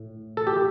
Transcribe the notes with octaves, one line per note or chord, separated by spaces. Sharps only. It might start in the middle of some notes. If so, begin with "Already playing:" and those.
Already playing: A2
A4
G4